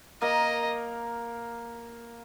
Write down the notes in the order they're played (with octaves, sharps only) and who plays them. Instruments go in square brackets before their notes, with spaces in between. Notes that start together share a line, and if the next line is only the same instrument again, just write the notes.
[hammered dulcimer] A#3 A#4 [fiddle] D#5